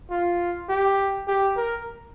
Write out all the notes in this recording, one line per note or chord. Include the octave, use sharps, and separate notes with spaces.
F4
G4
G4
A#4